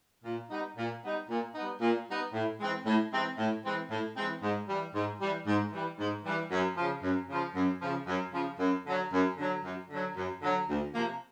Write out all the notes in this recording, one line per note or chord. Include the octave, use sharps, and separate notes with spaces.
A#2
G3 B3 D#4
A#2
G3 B3 D#4
A#2
G3 B3 D#4
A#2
G3 B3 D#4
A2
E3 G#3 C4
A2
E3 G#3 C4
A2
E3 G#3 C4
A2
E3 G#3 C4
G#2
E3 G3
G#2
E3 G3
G#2
E3 G3
G#2
E3 G3
F#2
C#3 F3
F#2
C#3 F3
F#2
C#3 F3
F#2
C#3 F3
F#2
D3 F#3
F#2
D3 F#3
F#2
D3 F#3
F#2
D3 F#3
D2
C3 F3 A#3